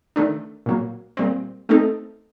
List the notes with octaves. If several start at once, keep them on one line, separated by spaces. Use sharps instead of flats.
D#3 A3 D4
A#2 F#3 A#3
A#2 G3 C4
A3 C4 D#4 A4